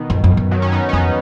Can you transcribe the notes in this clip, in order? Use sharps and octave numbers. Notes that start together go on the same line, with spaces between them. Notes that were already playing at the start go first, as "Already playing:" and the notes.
Already playing: B2 D#3
F2
F2
F#2
D#3 F#3
C#4
B3 D#4
C#4
F2 B3 D#4